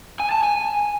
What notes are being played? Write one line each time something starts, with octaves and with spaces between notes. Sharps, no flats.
G#5
A5
G#5